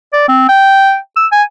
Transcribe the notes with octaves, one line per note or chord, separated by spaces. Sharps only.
D5
C4
G5
E6
G#5